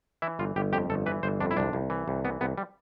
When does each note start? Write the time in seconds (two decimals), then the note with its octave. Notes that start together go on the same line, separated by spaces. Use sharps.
0.22 E3 E4
0.39 G1 F4
0.56 G1 G4
0.72 F2 G4
0.90 G1 A4
1.06 E3 B4
1.23 G1 C5
1.40 F2 D4
1.51 E4
1.57 C2 D4
1.73 C2
1.90 E3
2.08 C2
2.25 E3 B3
2.41 C2 B3
2.58 G3